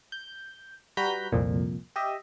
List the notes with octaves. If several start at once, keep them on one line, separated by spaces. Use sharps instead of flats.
G6
G3 F#4 B4 A#5 G6 B6
C2 F2 A#2
G4 D#5 E5